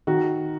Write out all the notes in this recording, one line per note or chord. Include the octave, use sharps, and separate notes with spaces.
D#3 F#4